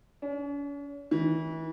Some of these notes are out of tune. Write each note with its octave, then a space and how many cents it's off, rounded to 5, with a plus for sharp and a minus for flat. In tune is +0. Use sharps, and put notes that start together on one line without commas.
C#4 +45
E3 -35